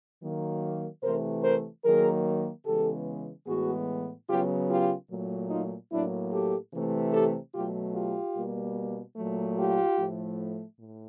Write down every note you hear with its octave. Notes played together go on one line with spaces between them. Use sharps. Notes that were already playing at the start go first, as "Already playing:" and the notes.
D#3 F#3 A#3
C3 E3 A3 A#4 C5
A#4 C5
D#3 F#3 A#3 G#4 A#4
C#3 E3 G#3 B3 G4 A4
A2 E3 G#3 B3 F#4 G#4
C#3 F#3 B3 F4 G4
F4 G4
A#2 F#3 A3
D#4 F4
A2 F#3 A#3 D4 E4
G4 A4
C3 E3 A3
G4 A4
B2 F#3 A3 F4 G4
F4 G4
B2 G3 A#3
A#2 F#3 A3
F4 G4
A2 F3 A3
A2